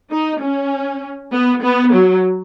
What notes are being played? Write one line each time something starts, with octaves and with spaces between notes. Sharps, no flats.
D#4
C#4
B3
B3
F#3